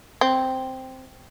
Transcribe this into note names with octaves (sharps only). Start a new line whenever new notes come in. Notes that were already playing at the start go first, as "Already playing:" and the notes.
C4